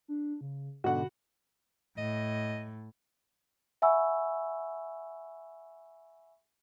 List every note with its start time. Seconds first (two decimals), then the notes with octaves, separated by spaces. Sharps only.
0.08 D4
0.41 C#3
0.84 G#2 B2 D3 F#4 F#5 B5
1.98 A2 D#5
3.82 E5 F#5 G#5 B5 C#6 E6